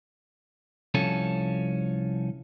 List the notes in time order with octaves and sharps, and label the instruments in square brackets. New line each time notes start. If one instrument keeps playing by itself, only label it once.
[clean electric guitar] C2 F3 C#4 A4